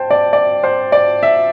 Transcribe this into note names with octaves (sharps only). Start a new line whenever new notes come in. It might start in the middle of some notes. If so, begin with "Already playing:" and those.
Already playing: C5 G5 A5
D5
D5
C5
D5
E5